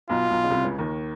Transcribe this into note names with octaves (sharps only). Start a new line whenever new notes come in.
B1 B2 F4
B1 B2
C#3
C2 C3
C#2 C#3
D#2 D#3